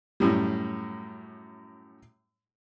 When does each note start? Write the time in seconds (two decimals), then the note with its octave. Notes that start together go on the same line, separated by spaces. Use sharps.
0.20 F#2 A2 G3